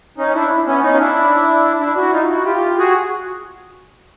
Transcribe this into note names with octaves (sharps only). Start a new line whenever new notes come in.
C#4 D#4
D4 E4
B3 C#4
C#4 D#4
F4
D4 E4
D4 E4
E4 F#4
D#4 F4
E4 F#4
F4 G4
F#4 G#4